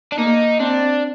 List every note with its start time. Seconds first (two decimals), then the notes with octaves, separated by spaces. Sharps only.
0.12 D4
0.18 A#3 D#4
0.60 C4 D4